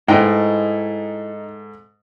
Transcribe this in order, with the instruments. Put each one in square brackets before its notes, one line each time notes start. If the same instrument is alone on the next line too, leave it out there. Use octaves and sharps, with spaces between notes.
[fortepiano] G#2 A3 [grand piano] D#4 [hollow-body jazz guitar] E4 [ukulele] B4 D#5 G5